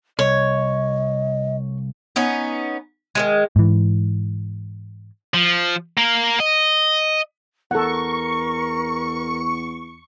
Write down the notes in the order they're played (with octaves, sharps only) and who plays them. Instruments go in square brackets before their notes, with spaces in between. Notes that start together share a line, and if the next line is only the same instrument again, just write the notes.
[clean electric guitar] C2 [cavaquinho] C#5 [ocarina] D#5
[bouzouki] B3 C#4 D#4
D#3 F#3 G#3
[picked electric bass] G#2 E3
[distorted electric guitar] F3
A#3 A#4
D#5
[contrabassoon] E2 [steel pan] A4 F#5 [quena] A#4 [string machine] C#6